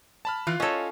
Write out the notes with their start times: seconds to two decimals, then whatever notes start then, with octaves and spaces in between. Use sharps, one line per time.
0.25 A5 B5 F6
0.47 E3 F4 F5 F#6
0.60 C#4 A4 C#5 D#5